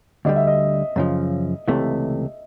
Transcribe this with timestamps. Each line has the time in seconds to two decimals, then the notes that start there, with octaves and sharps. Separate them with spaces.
0.25 D2 D3 G3 D#5
0.36 E5
0.47 D#5
0.96 F#2 C#3 F3
1.68 C#2 C3 E3 A3